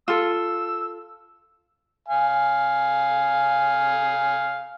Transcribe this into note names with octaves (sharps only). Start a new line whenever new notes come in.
F4 A4 E6
F5 G#5